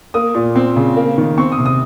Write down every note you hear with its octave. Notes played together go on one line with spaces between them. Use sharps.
A#3 D#6
A#2
C4
C#3
A#3
D#3
C4 C#6
D#6
C3
D#6